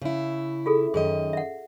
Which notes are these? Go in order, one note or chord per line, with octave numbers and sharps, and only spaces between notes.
C#3 E4
F4 G#4 A4
F#2 D#3 G#4 D#5
E5 F#5